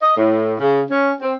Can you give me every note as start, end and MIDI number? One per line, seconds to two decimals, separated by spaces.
0.02 0.16 75
0.17 0.54 45
0.60 0.81 49
0.90 1.12 61
1.21 1.34 60